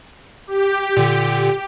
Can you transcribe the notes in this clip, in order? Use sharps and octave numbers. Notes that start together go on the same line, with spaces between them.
G4
A#2 D3